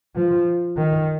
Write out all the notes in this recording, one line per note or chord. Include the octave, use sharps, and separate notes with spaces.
F3
D#3